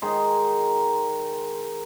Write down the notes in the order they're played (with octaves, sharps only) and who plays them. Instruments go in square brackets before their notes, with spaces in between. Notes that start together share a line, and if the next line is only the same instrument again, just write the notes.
[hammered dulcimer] D#3 G#3 D#4 C6